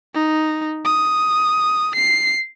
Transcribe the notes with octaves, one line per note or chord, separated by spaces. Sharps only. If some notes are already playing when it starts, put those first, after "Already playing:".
D#4
D#6
C7